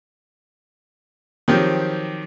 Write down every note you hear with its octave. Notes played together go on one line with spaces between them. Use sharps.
D#3 F3 F#3 C4 G4